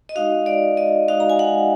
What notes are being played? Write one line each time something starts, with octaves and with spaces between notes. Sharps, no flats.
D#5
G#3 D#4 F#4 F5
D5
D#5
G#3 D#4 F#4 F5
A#5
G#5
F#5